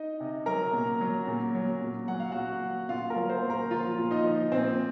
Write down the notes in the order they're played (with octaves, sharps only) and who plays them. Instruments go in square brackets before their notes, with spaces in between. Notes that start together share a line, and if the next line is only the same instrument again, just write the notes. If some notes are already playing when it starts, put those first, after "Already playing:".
Already playing: [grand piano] D#4 D#5
C3
F#3 A#4 A#5
A#2
F#3
A#2
F#3
A#2
F#3 F#5
F5
A#2 F#4 F#5
F#3
A#2 F4 F5
A#4 A#5
F#3
C5 C6
A#2
A#4 A#5
F3 F4 F5
A#2
D#4 D#5
F3
A#2 C4 C5